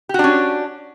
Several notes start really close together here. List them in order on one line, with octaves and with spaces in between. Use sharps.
G4 F#4 D4 C#4